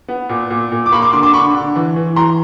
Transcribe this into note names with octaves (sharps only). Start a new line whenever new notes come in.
B3
A#2
A#2
A#2
D6
A#3 B5 C#6
C6 D6
D3 C6 D6
C6 D6
D3 B5 C#6
D3
E3
E3
E3 A#5 C6